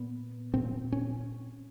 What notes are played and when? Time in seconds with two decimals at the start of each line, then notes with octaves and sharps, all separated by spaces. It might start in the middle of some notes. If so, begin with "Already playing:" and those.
Already playing: A#2 B3
0.54 A#2 C4
0.92 C#4